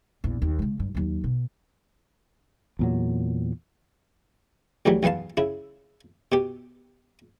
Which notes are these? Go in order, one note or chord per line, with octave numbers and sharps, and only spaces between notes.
A#1 E2
D#2
C#3 G#3
G2
D#2 F#3
B2
E2 A#2 F#3
C#2 A2 E3 F#3 G3
B1 E2 B3 F5 A5
C#3 E4
B2 G4